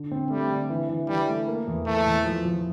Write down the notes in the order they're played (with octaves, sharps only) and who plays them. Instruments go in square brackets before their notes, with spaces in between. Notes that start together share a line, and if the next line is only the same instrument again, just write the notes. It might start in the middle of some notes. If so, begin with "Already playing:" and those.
Already playing: [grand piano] D3
C4
[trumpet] G3 [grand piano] A3
[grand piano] D3
E3
E3
[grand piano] E3 [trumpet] G3
[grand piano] A3
A#3
E2
[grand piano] E3 [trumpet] A3
[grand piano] E2
F3
F3